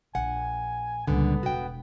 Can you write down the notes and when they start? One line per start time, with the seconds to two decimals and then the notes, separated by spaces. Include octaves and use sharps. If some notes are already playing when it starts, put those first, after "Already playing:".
0.15 A#1 F#5 G#5
1.08 C#2 A#2 D3 G3 B3
1.43 E1 F#4 G5